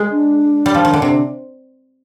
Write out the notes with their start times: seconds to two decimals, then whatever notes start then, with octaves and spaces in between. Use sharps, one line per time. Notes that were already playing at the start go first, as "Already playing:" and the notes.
Already playing: G#3
0.11 D4
0.66 G3
0.75 F3
0.85 D#3
0.93 D3
1.02 C3 D4